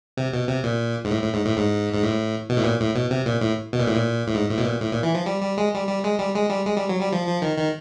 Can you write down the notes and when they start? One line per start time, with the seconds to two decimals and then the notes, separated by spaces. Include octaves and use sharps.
0.17 C3
0.33 B2
0.49 C3
0.63 A#2
1.05 G#2
1.11 A2
1.22 A2
1.34 G#2
1.45 A2
1.57 G#2
1.94 G#2
2.03 A2
2.50 B2
2.58 A2
2.64 A#2
2.80 A2
2.95 B2
3.11 C3
3.26 A#2
3.41 A2
3.73 B2
3.79 A#2
3.87 A2
3.95 A#2
4.27 A2
4.35 G#2
4.50 A2
4.58 B2
4.65 A#2
4.81 A2
4.92 A#2
5.03 E3
5.15 F3
5.26 G3
5.43 G3
5.57 G#3
5.74 G3
5.88 G3
6.04 G#3
6.19 G3
6.35 G#3
6.50 G3
6.66 G#3
6.77 G3
6.89 F#3
7.01 G3
7.12 F3
7.27 F3
7.42 D#3
7.58 D#3